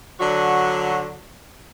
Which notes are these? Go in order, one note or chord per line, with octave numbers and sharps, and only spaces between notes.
D3 F#3 D4 F#4